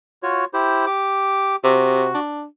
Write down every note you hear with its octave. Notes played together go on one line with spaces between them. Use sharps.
F4 F#4 C#5
E4 G4 C5
G4 D6
C3 F#4
D4